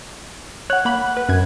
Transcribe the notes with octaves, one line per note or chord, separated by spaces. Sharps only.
C#5 F#5 F#6
A#3 B5
B4
F#2 G#6